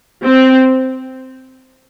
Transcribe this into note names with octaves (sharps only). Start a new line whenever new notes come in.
C4